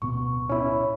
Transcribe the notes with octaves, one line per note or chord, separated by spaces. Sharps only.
D1 B2 B3 C#6
C#4 E4 C#5 B5